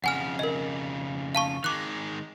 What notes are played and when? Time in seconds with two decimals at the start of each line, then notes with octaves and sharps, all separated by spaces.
0.04 F2 C#3 F#5 G#5 F6
0.39 A#4 D#5
1.35 F5 A5 C#6
1.64 D#3 G#3 D6 F#6